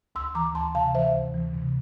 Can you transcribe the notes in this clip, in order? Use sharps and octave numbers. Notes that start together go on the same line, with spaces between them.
D2 C6 E6
E3 A#5 D6
D2 A5 C6
C3 F5 A5
E3 C5 E5
D2
E3
C3